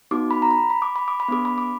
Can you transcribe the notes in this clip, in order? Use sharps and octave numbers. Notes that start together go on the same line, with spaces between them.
B3 D#4 F#4 D6
B5
A#5
B5
B5
D6
B5
D6
B5
B3 D4 G#4 D6
B5
D6